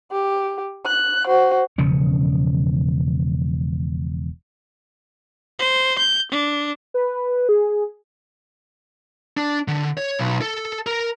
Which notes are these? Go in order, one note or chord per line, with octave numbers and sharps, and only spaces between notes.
G4
F#6
F#4 C5
E1 C#3 F3 C#4
C5
G6
D4
B4
G#4
D4
D3
C#5
B1
A4
A#4